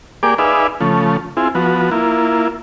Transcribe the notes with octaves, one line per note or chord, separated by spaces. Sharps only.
A#3 G4 G#4 D5 D6
D#4 G#4 B4 D5 E5 F5
C#3 F3 A3
C4 E4 F4 G#4
F3 B3 F#4
A#3 E4 F4